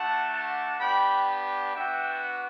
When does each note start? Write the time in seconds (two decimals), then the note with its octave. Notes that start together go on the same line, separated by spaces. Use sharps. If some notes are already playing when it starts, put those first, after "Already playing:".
Already playing: A3 D4 F#4 F#5 A5
0.32 F#5 A5
0.80 B3 D4 G4 G5 B5
1.73 B3 D4 F#4 E5 G5